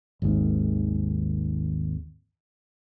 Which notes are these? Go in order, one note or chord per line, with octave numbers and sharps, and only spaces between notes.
G#1 D#2 G#2 D#3